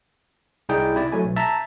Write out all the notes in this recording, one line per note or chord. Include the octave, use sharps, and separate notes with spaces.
C2 D#4 E4 G#4 D5 G5
C3 E4 D5
F#3 A3 G#5
B1
E5 A5 A#5